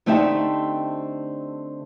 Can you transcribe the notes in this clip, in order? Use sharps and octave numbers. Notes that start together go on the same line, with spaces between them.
D3 A3 C4 D#4 G4 E5